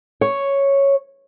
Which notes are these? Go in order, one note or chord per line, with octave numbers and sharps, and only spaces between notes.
C#5